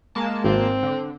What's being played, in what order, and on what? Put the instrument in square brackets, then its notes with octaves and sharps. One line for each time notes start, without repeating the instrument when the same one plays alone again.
[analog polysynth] G#3 A#3 A5
[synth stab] G#1 [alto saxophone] C4
[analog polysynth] D3